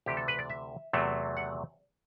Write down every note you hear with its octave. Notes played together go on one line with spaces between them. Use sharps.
D2 C3 E3 G4
A4
B4
D5
E5
E2 C3 F#3 A3
F#5